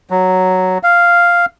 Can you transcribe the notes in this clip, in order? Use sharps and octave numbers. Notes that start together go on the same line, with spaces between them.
F#3
F5